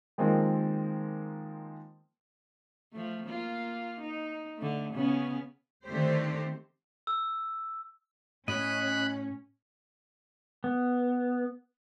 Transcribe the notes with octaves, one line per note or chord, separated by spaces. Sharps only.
D#3 F3 G#3 A#3 C4
F3 A3
A#3 F4
D#4
D3 A3
C#3 B3 C#4
D3 D#3 A3 C4 G4 C5
E6
A2 C#4 D#5 B5 F#6
B3